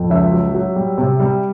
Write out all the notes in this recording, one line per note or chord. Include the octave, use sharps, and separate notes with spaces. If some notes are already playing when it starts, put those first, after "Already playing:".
Already playing: F2
C#2 E5
F#3
F#3
G3
C3
G3